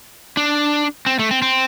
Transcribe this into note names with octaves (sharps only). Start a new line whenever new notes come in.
D4
C4
A3
C4
C4